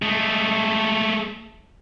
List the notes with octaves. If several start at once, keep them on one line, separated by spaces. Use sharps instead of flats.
G#3 A3